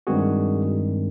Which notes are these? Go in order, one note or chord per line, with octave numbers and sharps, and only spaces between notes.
G2 D#3 G#3 C4 F#4 G#4